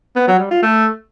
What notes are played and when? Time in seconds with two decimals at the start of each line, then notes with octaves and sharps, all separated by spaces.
0.16 B3
0.28 F#3
0.39 G3
0.51 F4
0.63 A3